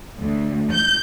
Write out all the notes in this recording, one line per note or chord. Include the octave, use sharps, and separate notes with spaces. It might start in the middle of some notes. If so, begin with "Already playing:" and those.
D2
G6